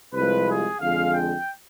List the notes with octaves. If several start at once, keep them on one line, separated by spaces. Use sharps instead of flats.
C2 C3 F3 G#3 B4
G#4
F2 D3 G#3 F5
G5